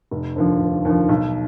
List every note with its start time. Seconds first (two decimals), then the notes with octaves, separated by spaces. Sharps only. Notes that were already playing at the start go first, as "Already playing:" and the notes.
0.11 F1
0.36 D#2 D3 F3
0.60 F1
0.85 D#2 D3 F3
1.09 B1